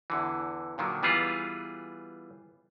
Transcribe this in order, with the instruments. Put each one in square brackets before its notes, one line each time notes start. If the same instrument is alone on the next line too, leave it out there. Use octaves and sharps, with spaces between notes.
[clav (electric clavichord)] E2 D3 E3
A#2 D3 D#3 F#3
E3 G3 B3 F4 G#4 A#5